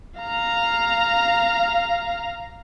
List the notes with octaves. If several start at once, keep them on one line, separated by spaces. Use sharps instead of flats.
F5 A#5